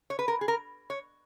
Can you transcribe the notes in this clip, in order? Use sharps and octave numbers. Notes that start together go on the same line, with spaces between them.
C#5
B4
A#4
G#4
A#4
C#5